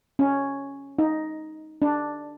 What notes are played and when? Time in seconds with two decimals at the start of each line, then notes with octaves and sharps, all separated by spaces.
0.19 C#4
0.99 D#4
1.82 D4